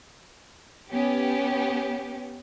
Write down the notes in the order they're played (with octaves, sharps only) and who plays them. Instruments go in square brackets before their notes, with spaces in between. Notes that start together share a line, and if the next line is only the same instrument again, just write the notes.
[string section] B3 C#4 G4